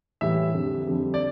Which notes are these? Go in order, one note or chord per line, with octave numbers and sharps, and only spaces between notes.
A2 E3 G3 E5
F2 D3 G3
F2 D3 G3
D5